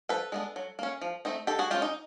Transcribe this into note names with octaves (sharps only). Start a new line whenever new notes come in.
F3 A4 B4
G#3 B3 D4
F#3
A#3 C#4
F3
A3 C4 D#4
D#3 G4 A4
F#4 G#4
G#3 C#4 F4 G4
D#4